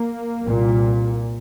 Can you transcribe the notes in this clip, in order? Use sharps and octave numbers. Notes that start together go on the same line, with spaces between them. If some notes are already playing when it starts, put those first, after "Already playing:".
Already playing: A#3
C2 A#2